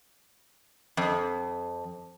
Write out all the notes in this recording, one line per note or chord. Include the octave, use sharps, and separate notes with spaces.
F2